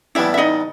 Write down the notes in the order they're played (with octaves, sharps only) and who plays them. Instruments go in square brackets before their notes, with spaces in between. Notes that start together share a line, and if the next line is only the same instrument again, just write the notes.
[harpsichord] A2 E3 G3 B3 [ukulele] E4 E5
[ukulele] E5
D#4 D#5